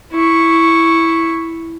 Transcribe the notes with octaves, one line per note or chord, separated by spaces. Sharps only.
E4 C#6